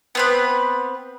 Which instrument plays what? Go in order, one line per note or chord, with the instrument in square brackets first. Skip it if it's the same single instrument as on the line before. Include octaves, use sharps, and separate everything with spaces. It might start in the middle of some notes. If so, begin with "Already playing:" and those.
[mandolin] B3 C4 B4